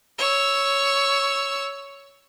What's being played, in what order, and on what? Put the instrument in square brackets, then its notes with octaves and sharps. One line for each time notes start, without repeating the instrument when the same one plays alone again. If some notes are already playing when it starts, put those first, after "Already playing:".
[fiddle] C#5 E6